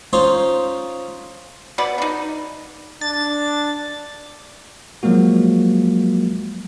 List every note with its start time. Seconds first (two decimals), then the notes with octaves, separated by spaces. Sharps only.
0.13 C#4 D#4 F4 C5
1.78 B2 B3 D5 B5
1.98 D4 D#4
3.01 D4 A6
5.03 F3 F#3 G#3 A#3 F#4